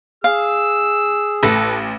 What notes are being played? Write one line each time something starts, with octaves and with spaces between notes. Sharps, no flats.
G#4 F5 E6
A1 A4 B4 A#6